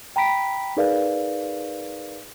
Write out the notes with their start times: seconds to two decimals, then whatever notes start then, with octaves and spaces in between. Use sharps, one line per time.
0.16 G5 A#5 B5 B6 D7
0.77 D#4 G#4 A#4 B4 D5 F5